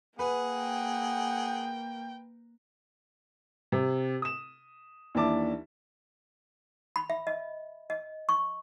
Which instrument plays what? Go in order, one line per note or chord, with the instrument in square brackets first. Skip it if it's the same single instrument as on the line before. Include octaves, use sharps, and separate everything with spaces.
[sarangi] A#3 [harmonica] G#4 F#5 [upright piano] B4
[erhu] G5
[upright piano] C3
D#6 E7
D#2 E3 D4 E5 A5 D6
[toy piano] B5
E5
D#5
D#5
C#6